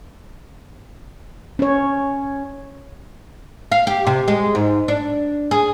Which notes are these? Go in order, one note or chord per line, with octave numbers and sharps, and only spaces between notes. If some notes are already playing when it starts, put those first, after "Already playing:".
C#4 C#5
F5
G4
C3
G#3
G#2
D4
G#4